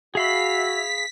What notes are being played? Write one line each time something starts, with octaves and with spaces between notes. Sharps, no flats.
F#4 G#4 E5 F5 B5 B6